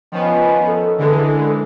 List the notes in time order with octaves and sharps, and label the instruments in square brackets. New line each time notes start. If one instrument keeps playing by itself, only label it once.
[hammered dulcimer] D#3 C#4 [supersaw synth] F3 B3
[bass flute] A4
[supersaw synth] D3 E3 G#3 [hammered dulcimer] A5
[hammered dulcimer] A5